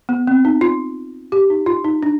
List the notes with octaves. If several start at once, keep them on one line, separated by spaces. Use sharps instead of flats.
B3
C4
D#4
F4
G4
D#4
F4
D#4
D4